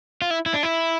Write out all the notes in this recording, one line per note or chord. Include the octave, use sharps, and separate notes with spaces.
F4
E4
E4
D4
E4